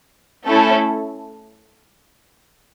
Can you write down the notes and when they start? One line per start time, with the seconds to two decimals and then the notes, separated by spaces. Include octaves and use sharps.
0.46 A3 C#4 E4 A4